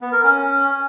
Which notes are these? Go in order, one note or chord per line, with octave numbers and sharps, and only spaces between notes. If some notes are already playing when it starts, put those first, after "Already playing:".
B3
A#4
C#4